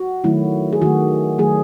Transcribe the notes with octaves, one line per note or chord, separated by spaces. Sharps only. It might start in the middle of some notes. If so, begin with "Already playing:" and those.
Already playing: F#4
D#3 F#3 A3 E4
G#4
D#3 F#3 A3 F#4
D#3 F#3 A3 G#4